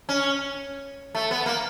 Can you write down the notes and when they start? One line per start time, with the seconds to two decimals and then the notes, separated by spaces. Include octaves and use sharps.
0.09 C#4
1.15 A3
1.31 B3
1.46 A#3